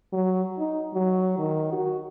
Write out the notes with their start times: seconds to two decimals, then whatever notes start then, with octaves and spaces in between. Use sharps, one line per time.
0.13 F#3
0.59 D#4
0.94 F#3
1.39 D#3
1.72 F#4